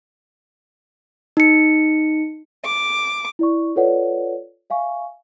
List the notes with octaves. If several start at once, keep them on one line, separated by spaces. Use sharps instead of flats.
D#4 C#7
D6
E4 D5 C#6
F4 A4 B4 C#5 D5 F#5
E5 F5 G#5 C#6